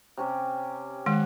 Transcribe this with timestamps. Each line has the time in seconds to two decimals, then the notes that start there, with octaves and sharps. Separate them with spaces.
0.17 C3 C#4 G4
1.06 D#3 G#3 F#5